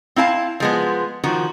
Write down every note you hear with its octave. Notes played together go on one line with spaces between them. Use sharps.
C4 E4 F5 A5
F3 G#3 B3
D#3 F3 F#4